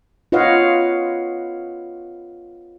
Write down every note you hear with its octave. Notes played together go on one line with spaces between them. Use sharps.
F4 B4 C#5 D#5 F5 F#5